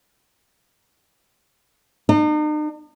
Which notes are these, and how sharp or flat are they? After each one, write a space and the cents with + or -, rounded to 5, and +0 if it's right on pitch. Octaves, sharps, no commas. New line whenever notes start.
D#4 -45